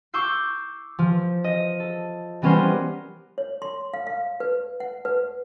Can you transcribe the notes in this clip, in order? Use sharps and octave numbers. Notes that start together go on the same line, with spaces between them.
C#6 D6 E6 G6 C7
F3
D#5
A4
E3 G3 B3 C#4 A#4 C5
C#5
C6
F5
F5
B4
F#5
B4